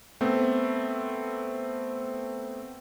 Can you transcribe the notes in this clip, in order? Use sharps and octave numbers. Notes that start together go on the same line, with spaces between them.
A3 B3 C4